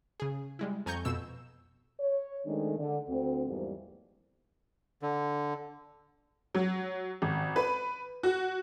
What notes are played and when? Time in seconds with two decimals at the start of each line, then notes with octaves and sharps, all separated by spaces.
0.20 C#3 G#4
0.59 G3 G#3 E4
0.86 F2 G#5 A#5 C#6 G6
1.05 F2 B2 E6 E7
1.99 C#5
2.45 D#3 G#3 A3 C4 D4 D#4
2.78 D3
3.08 D2 C4
3.47 E2 G#2 F3 G3 A#3
5.02 D3
6.54 F#3
7.22 G#1
7.56 B4
8.23 F#4